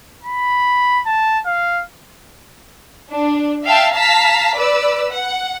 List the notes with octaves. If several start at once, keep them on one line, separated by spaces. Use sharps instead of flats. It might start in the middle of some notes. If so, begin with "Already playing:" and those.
B5
A5
F5
D4
E5 F5 G5 A5
F5 A5 A#5 B6
B4 D5 E6
F#5